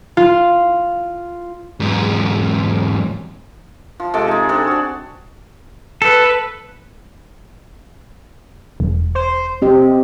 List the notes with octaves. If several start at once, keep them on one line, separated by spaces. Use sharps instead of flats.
F4
E2 G#2
F3
C3 G#3 A4 D6
D#4 G#4
C4 D4 G#4 A4
F#4 D5
A4 B4
E1
C5
C3 C4 G4 D#5